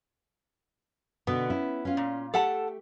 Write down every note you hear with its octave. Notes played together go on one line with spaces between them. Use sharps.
B2 D3 B3
C#4 E4
C#4 F4
A#2
A3 G4 A4 F#5 A5